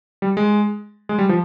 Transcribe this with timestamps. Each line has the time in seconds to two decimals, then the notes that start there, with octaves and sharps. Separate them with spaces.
0.22 G3
0.37 G#3
1.09 G#3
1.19 G3
1.29 F3